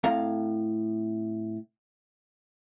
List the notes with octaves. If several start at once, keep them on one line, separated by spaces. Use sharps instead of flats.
A2 C4 A4 F5 A#5